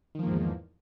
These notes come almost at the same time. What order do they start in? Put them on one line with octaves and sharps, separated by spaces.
D#3 F3 A#3 G#2 E2